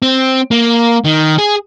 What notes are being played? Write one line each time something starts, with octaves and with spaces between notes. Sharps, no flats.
C4
A#3
D#3
G#4